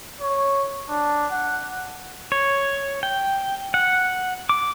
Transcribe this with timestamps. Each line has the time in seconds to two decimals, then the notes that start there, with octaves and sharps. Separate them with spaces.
0.21 C#5
0.90 D4
1.32 F#5
2.32 C#5
3.03 G5
3.74 F#5
4.49 D6